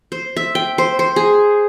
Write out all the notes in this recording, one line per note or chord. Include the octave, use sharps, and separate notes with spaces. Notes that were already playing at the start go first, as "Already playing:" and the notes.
C5
E5
G5
C5
C5
G#4